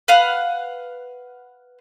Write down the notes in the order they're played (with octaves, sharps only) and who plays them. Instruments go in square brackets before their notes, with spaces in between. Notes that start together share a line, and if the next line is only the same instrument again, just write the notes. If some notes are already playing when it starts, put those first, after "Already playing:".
[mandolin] B4 F5 F#5